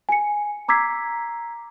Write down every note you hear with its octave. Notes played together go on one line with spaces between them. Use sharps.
G#5 C#7
A#5 D6 E6 G#6 B6 C7